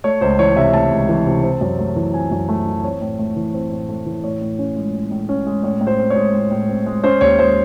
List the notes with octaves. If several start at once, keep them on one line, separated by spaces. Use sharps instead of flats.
A3 C#5
C#2 C5
E3 C#5
C3 E5
A3 A5
C#2
E3
C3
C4
F#2
A3
E3
C4 G#5
F#2
A3
E3
C4 C#5
A2
A3
E3
C4
A2
A3
E3
A2 C#5
A2
C#4
G#3
A2
A2
C#4
G#3
A2 C#5
A2
C5
C4
C#5
G#3
A2
A2
C4
G#3
C#4 C5
D#2 C#5
G#3 C5